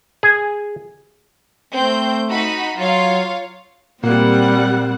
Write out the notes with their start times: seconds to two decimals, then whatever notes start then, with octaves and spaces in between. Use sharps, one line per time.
0.23 G#4
1.73 A3 C4 G6
2.30 D#4 F#4 B5
2.77 F#3 F4 C#5 F5
4.04 A#2 G3 A#3 C4 F#5